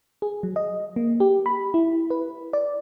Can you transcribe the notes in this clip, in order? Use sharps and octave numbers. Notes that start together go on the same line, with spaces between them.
G#4
F#3
D#5
A#3
G4
B5
E4
B4
D5